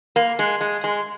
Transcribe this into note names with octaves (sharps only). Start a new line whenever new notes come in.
A#3
G#3
G#3
G#3